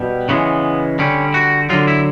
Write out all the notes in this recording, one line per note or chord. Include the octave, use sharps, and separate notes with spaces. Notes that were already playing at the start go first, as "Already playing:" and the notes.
Already playing: B2 G3
C#3 E3 G#3 B3
D3 G3 C#4
F#4
D3 F#3 F4
E4